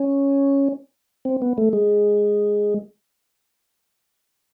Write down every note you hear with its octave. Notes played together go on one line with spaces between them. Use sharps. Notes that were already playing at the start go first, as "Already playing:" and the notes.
Already playing: C#4
C4
B3
A3
G#3